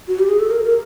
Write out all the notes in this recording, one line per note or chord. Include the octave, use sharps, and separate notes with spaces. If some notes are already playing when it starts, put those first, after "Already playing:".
F#4
G4
G#4
A4
A#4
A#4